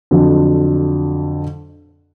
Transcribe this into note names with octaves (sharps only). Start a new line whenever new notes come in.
F2 D3 F#3